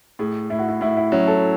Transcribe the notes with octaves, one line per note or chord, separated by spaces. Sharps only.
A2 G#4
A2 E4
F#4
E4
A2 E4
E4
F#3 C#4
A4